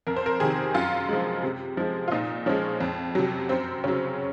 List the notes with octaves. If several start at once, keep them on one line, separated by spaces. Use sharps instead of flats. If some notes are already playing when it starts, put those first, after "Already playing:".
F2 A#4
C5
A#4
C3 D#3 G#4
F#2 F4
F3 G#3
C3
F3 G#3
F4
A#2 D#4
F3 G#3 C#4
F2
C3 F#3
F#2 C4
C#3 F#3 C#4